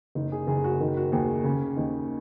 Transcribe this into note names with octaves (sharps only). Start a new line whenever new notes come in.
F#1 D#4
G#4
F#1 G#4
F#4
D#3 D#4
F#4
D#2 G#4
C#3 C#4
D#2 D#4